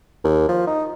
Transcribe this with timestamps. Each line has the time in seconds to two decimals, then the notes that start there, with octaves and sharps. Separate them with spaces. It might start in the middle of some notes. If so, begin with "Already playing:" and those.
0.24 D#2
0.49 F3
0.67 D#4